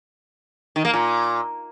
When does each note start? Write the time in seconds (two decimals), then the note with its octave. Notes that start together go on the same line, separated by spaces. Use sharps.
0.76 D#3
0.85 A#3
0.94 A#2